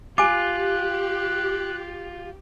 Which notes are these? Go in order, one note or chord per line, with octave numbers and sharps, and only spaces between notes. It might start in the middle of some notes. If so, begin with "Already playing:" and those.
F4 G4 G#5 D6 F#6